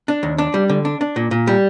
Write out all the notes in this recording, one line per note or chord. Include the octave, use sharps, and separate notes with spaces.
D4
D#2
D4
G3
D3
D4
D4
A#2
A#2
G3